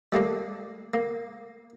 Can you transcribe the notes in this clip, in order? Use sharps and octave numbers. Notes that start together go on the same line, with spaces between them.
G3 A3 A#3 D4
A#3